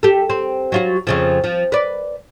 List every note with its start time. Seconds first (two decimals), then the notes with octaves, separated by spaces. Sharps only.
0.03 G4 A4
0.30 C4
0.72 F#3 F4 F#4
1.07 F2 C#3 F3
1.44 F3
1.72 B4 D5